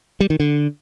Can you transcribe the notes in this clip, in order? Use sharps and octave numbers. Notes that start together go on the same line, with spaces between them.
G3
D#3
D3